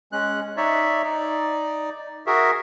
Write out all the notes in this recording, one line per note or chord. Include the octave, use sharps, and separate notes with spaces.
G#3 C#4 F#6
D#4 C#5 D5 E5
D#4 D5
F#4 G#4 A#4 E5